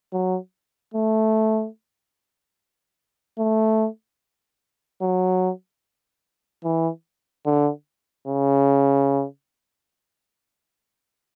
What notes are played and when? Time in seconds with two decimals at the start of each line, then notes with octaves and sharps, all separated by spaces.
0.13 F#3
0.94 A3
3.39 A3
5.02 F#3
6.64 E3
7.46 D3
8.27 C#3